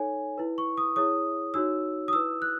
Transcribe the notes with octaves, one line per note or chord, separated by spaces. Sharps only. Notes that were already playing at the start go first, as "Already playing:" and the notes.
Already playing: D#4 A4 C#5 G#5
E4 B4
C#6
D#6
E4 G#4 C#5 D#6
D#4 F#4 C#5 E6
D#6
E4 B4 E6
F#6